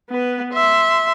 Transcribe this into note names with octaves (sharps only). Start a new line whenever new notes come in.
B3 B4
E5 C6